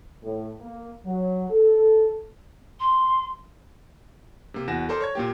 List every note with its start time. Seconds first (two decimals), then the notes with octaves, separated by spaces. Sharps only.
0.23 A2
0.61 A#3
1.05 F#3
1.50 A4
2.80 C6
4.54 C3 A#3
4.67 E2 F#4 A#6 E7
4.89 A4 A#4 C5 D5 A5
5.01 C#5 C#6 G#6
5.15 A#2 A#3 G4